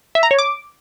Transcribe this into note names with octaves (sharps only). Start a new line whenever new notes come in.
E5
A#5
C#5
D6